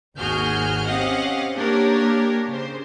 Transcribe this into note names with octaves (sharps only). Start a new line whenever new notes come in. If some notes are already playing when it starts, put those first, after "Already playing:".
G#1 D#2 F#4 G#4 F6 G6
C4 C#4 G4 D#5 F5 F#5
A#3 D4 G4 A#4 C#5
C#3 C5